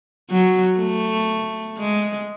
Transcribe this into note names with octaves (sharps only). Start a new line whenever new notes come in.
F#3
A3
G#3